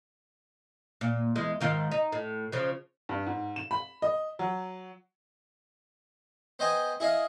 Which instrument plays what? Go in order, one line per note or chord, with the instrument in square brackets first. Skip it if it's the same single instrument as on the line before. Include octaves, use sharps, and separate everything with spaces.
[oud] A#2
E2 G#3
G#2 D#3 F4
D#4
A2
C#3 F3
[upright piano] G2
G#2
E7
B5
D#5
F#3
[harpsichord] B3 C5 D#5 G5 G#5
E4 G#4 D#5 F5